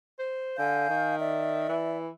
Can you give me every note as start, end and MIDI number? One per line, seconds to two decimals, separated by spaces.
0.19 0.55 72
0.58 0.86 50
0.58 1.15 77
0.58 1.15 80
0.58 1.15 91
0.89 1.68 51
1.18 1.97 74
1.18 1.97 76
1.69 2.09 52